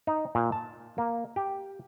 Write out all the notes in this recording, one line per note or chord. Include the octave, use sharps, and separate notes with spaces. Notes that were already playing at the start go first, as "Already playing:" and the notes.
D#4
A#2
A5
A#3
G4